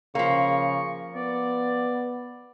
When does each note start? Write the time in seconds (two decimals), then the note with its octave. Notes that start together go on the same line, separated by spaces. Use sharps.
0.15 C#3 F3 A#3 C#6
1.16 B3 D5